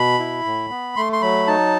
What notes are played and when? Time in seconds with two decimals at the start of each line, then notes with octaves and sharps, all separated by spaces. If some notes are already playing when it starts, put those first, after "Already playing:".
Already playing: B2 B5
0.19 E4
0.45 A2
0.70 B3
0.96 A3 C6
1.13 C6
1.22 F#3 B5
1.47 D#4 A5